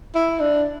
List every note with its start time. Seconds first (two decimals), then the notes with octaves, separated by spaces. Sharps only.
0.15 E4
0.40 D4